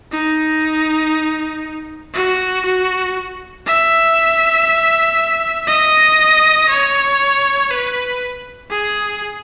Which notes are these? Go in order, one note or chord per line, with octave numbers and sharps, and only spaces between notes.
D#4
F#4
F#4
E5
D#5
C#5
B4
G#4